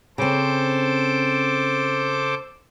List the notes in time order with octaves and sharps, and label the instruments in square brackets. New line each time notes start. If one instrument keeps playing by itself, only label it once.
[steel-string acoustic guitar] C#3 C4 [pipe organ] A4 C5 D6